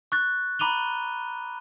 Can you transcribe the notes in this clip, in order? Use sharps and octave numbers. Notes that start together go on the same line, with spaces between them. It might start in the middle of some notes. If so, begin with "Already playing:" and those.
C#6 F#6 A6
A#5 B5 D6 D#7 F7 G7